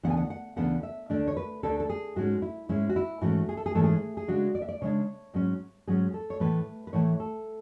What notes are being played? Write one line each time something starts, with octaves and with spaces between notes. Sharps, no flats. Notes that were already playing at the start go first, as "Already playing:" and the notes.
D2 C#3 E3 B3 D4 F#5
G#5
F#5
F#5
D2 C#3 E3 B3 D4 F#5
E5
D2 D3 A3 D4 D5
C#5
B4
D2 D3 A3 D4 A4
A4
G#4
G#2 G#3 C#4 F#4
E4
G#2 G#3 C#4 E4
F#4
E4
G#2 E3 A3 C#4 F#4
G#4
A4
G#4
G#2 E3 A3 C#4 A4
G#4
G#4
C#3 G#3 D4 F#4
D5
E5
D5
C#3 G#3 D4 C#5
G#2 F#3 C#4
G#2 F#3 C#4 G#4
A4
C#5
A2 E3 A3 B4
B4
A2 E3 A3 C#5
A4